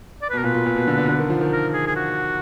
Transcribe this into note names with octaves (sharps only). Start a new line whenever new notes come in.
D5
B4
B2 A#4
A#2 B4
A#2
A#2
B2
D3
D3
B2
D3
D#3
F3
D#3
A#4
G#4
G#4
F#4